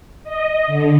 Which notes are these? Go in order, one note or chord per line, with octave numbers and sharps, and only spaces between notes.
D#5
D3